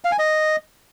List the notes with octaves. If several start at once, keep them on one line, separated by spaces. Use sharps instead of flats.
F5
G#5
D#5